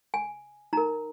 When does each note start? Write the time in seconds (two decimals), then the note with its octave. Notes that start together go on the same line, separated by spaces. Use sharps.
0.14 G#5
0.73 D#4 A#4 A#5